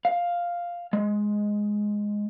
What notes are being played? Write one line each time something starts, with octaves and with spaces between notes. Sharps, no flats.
F5
G#3